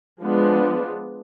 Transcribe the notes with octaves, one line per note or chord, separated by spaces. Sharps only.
F3 G#3 B3 D4